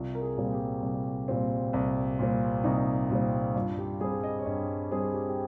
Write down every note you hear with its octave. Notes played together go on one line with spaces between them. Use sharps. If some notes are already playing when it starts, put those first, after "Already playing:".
Already playing: C2 F4
A#4
G#4
A#2 G3 C4
G4
C2
A#2 G3 C4
C2
A#2 G3 C4
C2 D#4
A#2 G3 C4
G2 F4
G4
G3 C4 G#4
D#5
C#5
G2 D#5
G3 C4 G#4
G4
G4